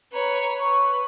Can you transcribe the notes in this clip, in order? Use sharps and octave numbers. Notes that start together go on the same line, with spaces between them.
B4 C#5 A#5
B4 C#6